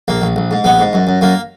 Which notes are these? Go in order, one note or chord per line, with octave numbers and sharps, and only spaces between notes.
A#1 A#3
A#1
A#1
G#2
A#1 B3
G#2
F#2
F#2
F#2 A#3